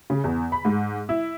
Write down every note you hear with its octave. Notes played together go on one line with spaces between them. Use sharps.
C#3
E2
B5
G#2
E4